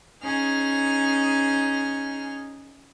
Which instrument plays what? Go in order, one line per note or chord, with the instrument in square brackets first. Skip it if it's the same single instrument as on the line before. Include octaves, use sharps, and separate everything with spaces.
[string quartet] C#4 D#4 G#4 F6